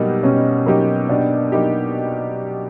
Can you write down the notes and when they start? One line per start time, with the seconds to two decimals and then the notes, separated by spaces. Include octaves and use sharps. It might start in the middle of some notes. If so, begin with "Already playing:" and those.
Already playing: B2 F#3 G3 A#3 D#4 G4
0.23 B2 C#4
0.66 F#3 A#3 D#4 G4
1.09 B2 D4
1.52 F#3 A#3 D#4 G4